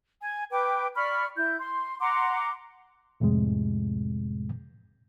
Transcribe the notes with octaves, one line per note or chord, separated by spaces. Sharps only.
G#5
B4 G5 D6
D5 B5 C#6 F6
E4 G6
C6
F#5 A#5 C6 D6
C2 F2 A2 C3 G#3